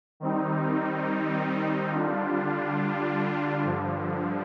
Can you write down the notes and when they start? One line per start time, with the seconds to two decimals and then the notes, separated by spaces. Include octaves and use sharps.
0.20 D#3 G3 C4 D#4
1.91 D3 G3 D4 F4
3.63 G2 D3 F3